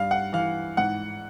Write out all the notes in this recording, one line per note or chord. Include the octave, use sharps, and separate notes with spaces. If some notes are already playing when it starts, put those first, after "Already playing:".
Already playing: G2 F5
F#5
E3 F5
G#2 F#5